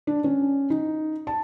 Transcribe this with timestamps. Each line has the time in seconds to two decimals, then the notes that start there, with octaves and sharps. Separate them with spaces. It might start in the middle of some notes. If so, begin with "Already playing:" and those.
0.07 D4
0.24 C#4
0.70 D#4
1.27 A5